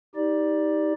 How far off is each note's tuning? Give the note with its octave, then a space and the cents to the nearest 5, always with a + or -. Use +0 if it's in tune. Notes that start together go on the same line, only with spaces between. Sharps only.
D#4 +25 G4 +0 D5 +5